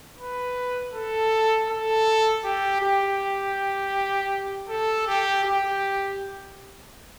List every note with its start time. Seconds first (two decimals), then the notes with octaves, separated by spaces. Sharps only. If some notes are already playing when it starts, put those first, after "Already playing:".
0.19 B4
0.94 A4
1.69 A4
2.44 G4
2.82 G4
4.69 A4
5.07 G4
5.44 G4